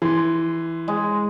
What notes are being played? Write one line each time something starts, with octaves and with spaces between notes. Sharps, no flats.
E3 C6
G#3